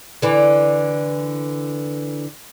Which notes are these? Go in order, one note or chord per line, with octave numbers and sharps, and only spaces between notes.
D3 E3